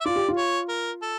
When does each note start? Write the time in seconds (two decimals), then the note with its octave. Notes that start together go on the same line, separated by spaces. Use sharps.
0.01 E5
0.05 F4 D5
0.16 G4
0.28 F4
0.37 C#5
0.69 A#4
1.02 A4